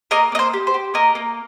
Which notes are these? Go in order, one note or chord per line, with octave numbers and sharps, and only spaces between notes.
A#3 A#4 D#5
A#3 D#5
C5
G4
C5
G4
A#3 A#4 D#5
A#3